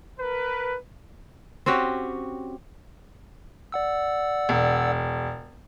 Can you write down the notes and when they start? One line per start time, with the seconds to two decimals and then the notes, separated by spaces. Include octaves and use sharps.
0.20 A#4 B4
1.66 C4 C#4 F#4 G4
3.72 D5 F#5 E6
4.49 E1